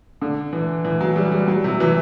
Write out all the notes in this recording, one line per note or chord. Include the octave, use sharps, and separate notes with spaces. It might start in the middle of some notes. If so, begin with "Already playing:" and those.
D3
E3
E3
F#3
G3
G3
F#3
C3
F#3
E3